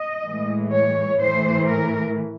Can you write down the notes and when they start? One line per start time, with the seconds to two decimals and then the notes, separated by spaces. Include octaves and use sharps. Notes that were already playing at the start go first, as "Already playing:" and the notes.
Already playing: D#5
0.25 A2 E3 G#3
0.72 C#5
1.19 A2 E3 A3 C5
1.66 A#4